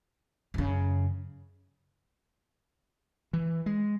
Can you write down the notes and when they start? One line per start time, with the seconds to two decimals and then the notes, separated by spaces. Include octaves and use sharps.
0.54 F#2 C#3
3.33 E3
3.66 G#3